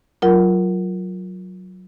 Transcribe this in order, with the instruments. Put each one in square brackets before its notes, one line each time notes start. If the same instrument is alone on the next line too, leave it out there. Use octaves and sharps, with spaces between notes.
[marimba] F#3 F4 A#4